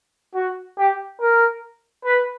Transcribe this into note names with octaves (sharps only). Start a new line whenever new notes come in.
F#4
G4
A#4
B4